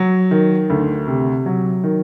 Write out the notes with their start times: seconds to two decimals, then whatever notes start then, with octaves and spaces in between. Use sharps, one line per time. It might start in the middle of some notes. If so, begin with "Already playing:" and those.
Already playing: F#3
0.31 D#3
0.70 D2
1.07 C3
1.46 F#3
1.84 D#3